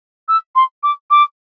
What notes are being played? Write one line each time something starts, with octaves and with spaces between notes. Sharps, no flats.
E6
C6
D6
D6